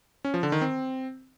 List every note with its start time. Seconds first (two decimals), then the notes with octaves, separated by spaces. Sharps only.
0.25 C#4
0.34 F3
0.43 D3
0.52 D#3
0.61 C4